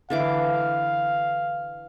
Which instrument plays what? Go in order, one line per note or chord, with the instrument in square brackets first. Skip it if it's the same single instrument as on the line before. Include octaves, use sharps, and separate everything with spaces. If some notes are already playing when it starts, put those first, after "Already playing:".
[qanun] D3 E3 D6 [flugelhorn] F5